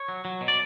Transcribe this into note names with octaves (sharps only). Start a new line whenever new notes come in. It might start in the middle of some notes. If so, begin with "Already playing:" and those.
Already playing: C#5
F#3
F#3
B2
D5